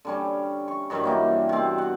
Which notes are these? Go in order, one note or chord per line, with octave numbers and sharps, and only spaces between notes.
D3 G3 C#4
C#6
G2 D#3 F#3 G3
E3 A#3 D#4
B2 C4
F#5